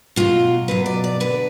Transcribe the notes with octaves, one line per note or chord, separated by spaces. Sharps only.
B2 F#3 F4
B2 F#3 B4
D5
D5
D3 F#3 B4